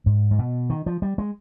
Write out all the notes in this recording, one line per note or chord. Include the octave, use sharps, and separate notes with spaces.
G#2
G#2
B2
D#3
F3
G3
G#3